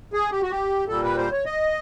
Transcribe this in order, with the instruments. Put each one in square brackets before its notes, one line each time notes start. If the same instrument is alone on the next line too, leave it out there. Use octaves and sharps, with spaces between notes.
[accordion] G#4
G4
F#4
G4
A#2 G3 A4
B4
C5
C#5
D#5